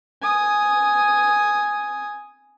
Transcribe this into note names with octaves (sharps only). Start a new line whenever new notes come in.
G#5 D#6